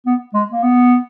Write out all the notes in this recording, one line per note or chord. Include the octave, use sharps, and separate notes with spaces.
B3
G#3
A#3
B3